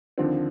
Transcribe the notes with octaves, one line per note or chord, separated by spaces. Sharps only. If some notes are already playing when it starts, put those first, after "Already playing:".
D#2 D3 F3 C4